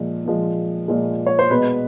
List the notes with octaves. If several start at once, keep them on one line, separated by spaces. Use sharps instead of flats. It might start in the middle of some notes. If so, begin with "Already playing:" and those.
Already playing: A#2 F3 G#3
A#2 F3 G#3
A#2 F3 G#3
C#5
C5
B2 G#3 B3 B4